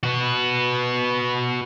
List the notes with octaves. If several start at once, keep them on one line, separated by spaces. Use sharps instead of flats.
F#4 B4